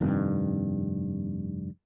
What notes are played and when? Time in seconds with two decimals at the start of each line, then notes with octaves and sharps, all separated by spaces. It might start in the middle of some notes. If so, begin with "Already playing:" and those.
0.01 F1 G2 D#3 C4